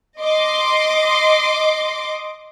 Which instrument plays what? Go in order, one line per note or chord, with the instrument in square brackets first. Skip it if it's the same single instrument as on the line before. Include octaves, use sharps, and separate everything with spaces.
[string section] D#5 C6 D6